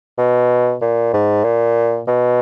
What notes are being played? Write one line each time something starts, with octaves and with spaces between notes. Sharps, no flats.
B2
A#2
G#2
A#2
B2